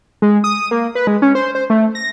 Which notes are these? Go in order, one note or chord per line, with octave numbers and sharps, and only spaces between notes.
G#3
D#6
A#3
B4
G#3
C#4
C5
C5
A3
A#6